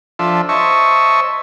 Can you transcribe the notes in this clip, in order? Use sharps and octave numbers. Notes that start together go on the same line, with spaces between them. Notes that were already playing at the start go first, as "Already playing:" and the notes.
F3 D4 F4 A4 E5
C5 C#5 D#5 E5 A5 C#6